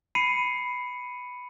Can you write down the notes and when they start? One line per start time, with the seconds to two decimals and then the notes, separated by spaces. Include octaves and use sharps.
0.15 B5 C7 C#7 D#7